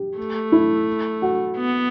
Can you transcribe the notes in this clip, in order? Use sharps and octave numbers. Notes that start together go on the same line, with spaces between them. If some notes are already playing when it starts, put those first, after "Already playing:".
Already playing: G4
A3
E4
F#4
B3